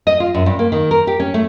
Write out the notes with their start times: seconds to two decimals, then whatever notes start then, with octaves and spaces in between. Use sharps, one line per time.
0.07 D#5
0.20 F4
0.35 F#2
0.46 G2
0.59 A#3
0.72 D#3
0.91 A#4
1.07 G4
1.20 C#4
1.34 A3